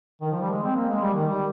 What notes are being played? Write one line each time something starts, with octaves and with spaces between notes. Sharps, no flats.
D#3
F3
G3
G#3
C4
A#3
G#3
G3
D#3
G3